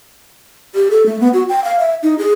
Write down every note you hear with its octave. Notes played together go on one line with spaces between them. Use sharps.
G4
A4
A3
B3
F#4
G5
F5
E5
D#4
G#4